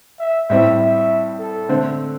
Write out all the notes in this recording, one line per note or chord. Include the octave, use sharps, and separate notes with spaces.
E5
A2 G3 C4 E4 E5
E5
A4
D3 A3 C4